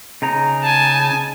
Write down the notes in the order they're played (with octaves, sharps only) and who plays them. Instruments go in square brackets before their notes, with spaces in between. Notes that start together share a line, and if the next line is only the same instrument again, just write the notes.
[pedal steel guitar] C#3 D#4 A#5
[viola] G#5 A5